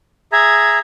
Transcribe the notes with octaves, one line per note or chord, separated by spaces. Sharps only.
G#4 E5 A#5 G#6